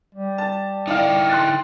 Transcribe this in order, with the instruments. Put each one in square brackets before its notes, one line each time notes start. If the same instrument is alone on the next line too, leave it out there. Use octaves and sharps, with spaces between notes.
[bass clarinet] G3
[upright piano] A5
[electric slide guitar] D#4 E4 G5 [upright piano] D5 F5
[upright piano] C6 F#6 A6